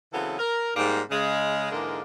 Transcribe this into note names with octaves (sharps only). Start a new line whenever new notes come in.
C#3 E3 F#3 B3 C4 A4
A#4
G#2 G3 A#3
C#3 G#3
G#2 D3 E3 G#3 A#3